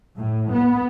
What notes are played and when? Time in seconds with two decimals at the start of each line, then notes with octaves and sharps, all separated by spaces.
0.17 A2
0.51 B3